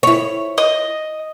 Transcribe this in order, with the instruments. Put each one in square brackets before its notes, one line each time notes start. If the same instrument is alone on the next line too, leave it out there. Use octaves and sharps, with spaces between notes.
[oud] E4 C#5
[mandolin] D#5